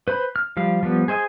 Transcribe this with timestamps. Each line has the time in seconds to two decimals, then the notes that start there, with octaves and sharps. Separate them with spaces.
0.08 B4 C5 B5
0.36 F6
0.57 F3 G3 F5
0.83 F3 G3 B3
1.08 G#4 C5 D#5 E5 G#5